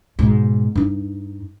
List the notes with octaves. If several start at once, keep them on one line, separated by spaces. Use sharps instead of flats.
G#2 B2
G2 D#4